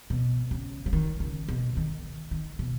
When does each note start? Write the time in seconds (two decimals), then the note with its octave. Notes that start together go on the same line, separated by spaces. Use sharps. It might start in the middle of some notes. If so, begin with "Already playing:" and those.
0.10 B2
0.51 C#3
0.86 F#3
0.93 D#3
1.20 C#3
1.49 B2
1.77 D#3
2.31 D#3
2.59 B2